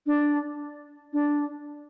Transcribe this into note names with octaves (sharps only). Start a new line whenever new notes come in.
D4
D4